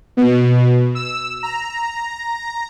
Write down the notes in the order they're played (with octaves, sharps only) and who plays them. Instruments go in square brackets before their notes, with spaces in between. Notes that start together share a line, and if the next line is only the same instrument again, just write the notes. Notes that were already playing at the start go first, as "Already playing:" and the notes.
[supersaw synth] B2
E6
A#5